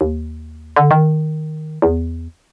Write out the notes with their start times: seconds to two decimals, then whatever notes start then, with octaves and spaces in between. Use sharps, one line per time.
0.01 D#2
0.76 D3
0.91 D#3
1.82 E2